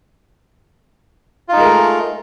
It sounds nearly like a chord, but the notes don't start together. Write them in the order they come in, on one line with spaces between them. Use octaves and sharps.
F4 D#4 G#3 A#4 A3